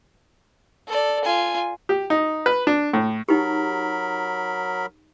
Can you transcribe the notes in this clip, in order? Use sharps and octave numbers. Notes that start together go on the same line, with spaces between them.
A4 D5
F4 G#5
G4
D#4
B4
D4
A2
F#3 D#4 G4 A#4 B5